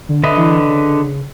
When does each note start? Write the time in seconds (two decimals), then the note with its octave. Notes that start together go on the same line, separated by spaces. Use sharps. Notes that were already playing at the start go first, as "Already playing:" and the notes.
0.09 D3
0.24 D3 B4 D#5 E5
0.37 E3
0.68 C#3